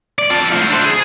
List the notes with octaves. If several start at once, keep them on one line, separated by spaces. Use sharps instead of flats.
D5
F4 A4
A3 C5
D4 C5
G#4